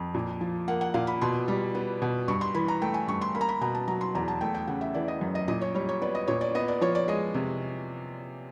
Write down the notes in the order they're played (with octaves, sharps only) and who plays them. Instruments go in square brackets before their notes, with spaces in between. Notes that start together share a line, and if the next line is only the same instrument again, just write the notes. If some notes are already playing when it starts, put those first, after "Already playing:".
Already playing: [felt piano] F2
A#2
F3
A#3 F#5
F#5
A#2 F5
B5
B2 C6
G3
B3
B2
G2 C#6
C6
E3 B5
A#5
A3 G5
G#5
G2 C#6
C6
A#3 B5
A#5
B5
B2 A#5
A5
F#3 A#5
C6
E2 A#5
A5
A3 G5
G5
C#3 F#5
E5
E3 D5
D#5
F#2
D#5
A#2 D#5
C#5
G3 C#5
C#5
B3 D5
D#5
A#2 C#5
D5
B3 D#5
D5
F3 C#5
D5
G#3 D#5
C3